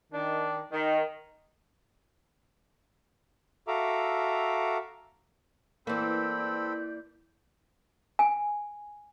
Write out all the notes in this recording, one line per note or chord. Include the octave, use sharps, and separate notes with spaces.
D#3 D4
D#3
F#4 A4 E5 F5 A#5 D6
E3 A#3 C4 A4 D5 B5 G6
G#5